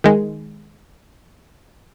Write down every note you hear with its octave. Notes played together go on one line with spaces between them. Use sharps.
D#3 G#3